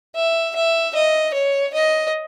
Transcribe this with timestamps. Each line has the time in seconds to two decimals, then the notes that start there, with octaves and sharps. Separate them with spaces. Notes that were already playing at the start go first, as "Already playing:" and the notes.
0.15 E5
0.55 E5
0.95 D#5
1.34 C#5
1.74 D#5